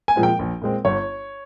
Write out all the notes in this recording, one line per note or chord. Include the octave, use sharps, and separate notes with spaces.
G#5
A#2 F3 G#3 C4
G5
A#1
A#2 G#3 C4
G1 C#5